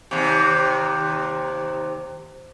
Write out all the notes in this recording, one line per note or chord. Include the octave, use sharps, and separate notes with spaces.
D#2 C3